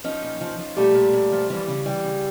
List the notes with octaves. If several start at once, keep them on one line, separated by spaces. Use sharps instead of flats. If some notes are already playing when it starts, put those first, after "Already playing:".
F3 C#4 D#4
A#2
F3
F3
A#2 G3 A3
A#2
A#2
F3
E3 G3
C#3
E3 G3
C#3